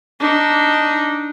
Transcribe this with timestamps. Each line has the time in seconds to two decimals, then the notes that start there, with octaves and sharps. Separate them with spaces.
0.20 D4 D#4